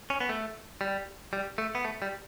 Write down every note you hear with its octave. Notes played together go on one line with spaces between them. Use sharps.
C#4
B3
A3
G3
G3
A3
B3
A3
G3